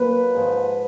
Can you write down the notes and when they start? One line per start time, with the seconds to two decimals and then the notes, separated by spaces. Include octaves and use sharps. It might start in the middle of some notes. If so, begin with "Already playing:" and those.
Already playing: A#2 F#3 B4
0.34 G#2 F3